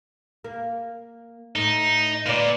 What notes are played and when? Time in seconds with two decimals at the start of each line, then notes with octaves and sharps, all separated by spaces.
0.44 A#3
1.56 A2 D#4
2.26 A#2 B4 C5 D5